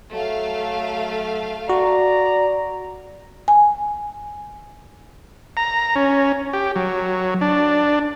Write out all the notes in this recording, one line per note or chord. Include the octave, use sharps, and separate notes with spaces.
F#3 A3 F5
F#4 D5 A#5
G#5
A#5
C#4
G4
F#3
D4